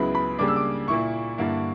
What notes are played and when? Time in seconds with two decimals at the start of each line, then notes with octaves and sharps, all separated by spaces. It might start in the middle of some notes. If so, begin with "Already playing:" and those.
Already playing: C#2 C#3 F#3 B3 E4 B5
0.15 B5
0.38 C#3 G3 A#3 D4 D6
0.48 E6
0.56 D6
0.88 A#2 A#3 E4 C#6
1.38 G2 D3 A#3 E4